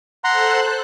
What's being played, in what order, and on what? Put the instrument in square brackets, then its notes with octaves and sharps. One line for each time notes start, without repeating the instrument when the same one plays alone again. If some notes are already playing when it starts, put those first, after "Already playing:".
[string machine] A4 C5 F#6 [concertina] F#5 A#5 C6